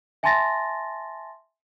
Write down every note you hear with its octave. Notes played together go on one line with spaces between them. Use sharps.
E5 G#5 A5 C6 A6 A#6